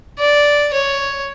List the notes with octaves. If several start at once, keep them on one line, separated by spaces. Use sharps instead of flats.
D5
C#5